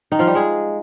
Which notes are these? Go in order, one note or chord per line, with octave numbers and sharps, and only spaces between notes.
D#3 D#4
F3 F4
G3 G4
G#3 G#4